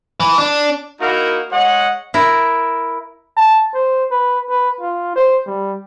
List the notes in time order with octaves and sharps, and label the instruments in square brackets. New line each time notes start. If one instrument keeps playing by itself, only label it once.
[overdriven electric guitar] E3
D4
[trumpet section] A#3 D#4 E4 F#4 A#4 F5
G#3 C#5 D#5 F#5
[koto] E4 A#4
[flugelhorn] A5
C5
B4
B4
F4
C5
G3